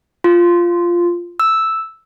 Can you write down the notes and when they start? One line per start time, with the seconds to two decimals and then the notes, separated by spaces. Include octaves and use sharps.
0.24 F4
1.40 E6